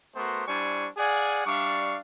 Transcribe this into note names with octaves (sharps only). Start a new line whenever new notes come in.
A3 B3 F#4 A#4 C5 C6
G3 D4 E4 C5 G#5 C#6
G#4 D5 F5 F#5 G#5
G3 D4 E5 F5 C#6